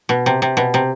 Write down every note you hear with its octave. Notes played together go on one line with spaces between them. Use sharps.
B2
C3
C3
B2
C3